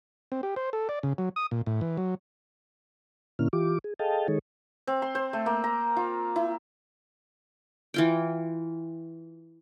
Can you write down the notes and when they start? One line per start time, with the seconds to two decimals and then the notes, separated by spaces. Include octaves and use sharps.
0.32 C4
0.43 G4
0.56 C5
0.73 A4
0.89 D5
1.03 C#3
1.18 F#3
1.36 D#6
1.51 A#2
1.66 A2
1.81 E3
1.97 F#3
3.39 A#2 D3 A#3 C#4 E4 F6
3.53 E3 F4 G4 D6
3.84 G#4
3.99 G#4 A4 D#5 F5 G5 A5
4.28 D#3 G#3 D#4 G#4 A4 C#5
4.87 C4
5.02 C6
5.15 C5
5.33 A3
5.46 A#3
5.64 A#5
5.96 F4
6.36 E4
7.94 E3 F4 G5